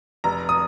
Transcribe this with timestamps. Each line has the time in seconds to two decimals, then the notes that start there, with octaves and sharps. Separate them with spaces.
0.24 F1 A#5
0.49 D#6